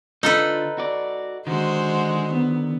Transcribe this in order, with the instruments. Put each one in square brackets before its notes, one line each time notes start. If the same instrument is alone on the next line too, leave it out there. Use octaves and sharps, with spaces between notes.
[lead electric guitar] D3 F4 [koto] D#4 A4 B4
[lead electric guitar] F#4 D5
[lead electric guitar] D3 D#3 [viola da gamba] G#3 F#4 C5
[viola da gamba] B3